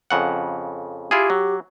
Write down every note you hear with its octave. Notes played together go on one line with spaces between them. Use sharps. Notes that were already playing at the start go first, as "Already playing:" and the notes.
F2 C#3 F#5
E4 F4 G4 G#4
F#3